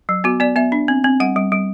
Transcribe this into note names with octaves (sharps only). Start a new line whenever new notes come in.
F#3
B3 F#4
B3 D5
B3 E5
D4
C4
C4
G3 F#5
G3
G3